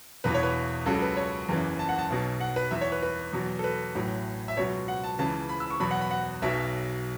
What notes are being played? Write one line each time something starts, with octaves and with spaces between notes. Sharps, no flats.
E1 E2 E3 B4
C#5
B4
C#2 C#3 F#3 A4
B4
C#5
F#1 E2 C#3 E3
A5
F#5
A5
B1 B2 F#3
F#5
B4
E2 E3 E5
C#5
B4
B4
E2 B2 F#3
A4
B4
A1 A2 F#3
E5
C#2 B2 F#3 C#5
F#5
A5
C#2 C#3 E3 A5
B5
E6
C#6
E2 B2 F#3 B5
F#5
B5
F#5
B1 B2 F#3 E5